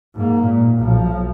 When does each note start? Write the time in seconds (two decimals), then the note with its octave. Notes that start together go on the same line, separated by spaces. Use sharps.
0.15 G#2 A#3
0.43 A#2
0.78 B1 F3